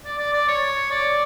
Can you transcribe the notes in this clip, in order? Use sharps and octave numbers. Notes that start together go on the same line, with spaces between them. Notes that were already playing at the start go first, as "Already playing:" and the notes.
D5
D5
D5
C#5
D5